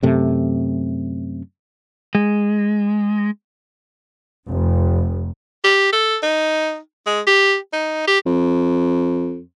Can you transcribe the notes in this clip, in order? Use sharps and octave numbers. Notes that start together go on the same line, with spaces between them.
F#2 C3 A3
G#3
F1
G4
A4
D#4
G#3
G4
D#4
G4
F2